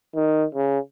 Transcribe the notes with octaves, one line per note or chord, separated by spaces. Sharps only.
D#3
C#3